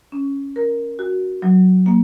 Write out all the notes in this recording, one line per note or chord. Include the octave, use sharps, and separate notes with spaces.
C#4
A#4
F#4
F#3
A#3